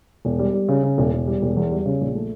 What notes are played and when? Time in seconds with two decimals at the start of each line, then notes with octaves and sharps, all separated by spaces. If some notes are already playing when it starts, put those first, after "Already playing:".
0.25 E1
0.39 G3
0.54 G3
0.69 C#3
0.83 C#3
0.98 E1
1.13 E1
1.27 G3
1.42 E1
1.57 E2
1.71 G3
1.86 C#3
2.01 A#1
2.15 A3